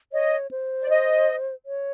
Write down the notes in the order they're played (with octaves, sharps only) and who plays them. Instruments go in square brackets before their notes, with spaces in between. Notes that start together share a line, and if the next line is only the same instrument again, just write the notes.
[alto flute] C#5 [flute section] D#5
[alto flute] C5
[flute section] D5
D#5
[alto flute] C#5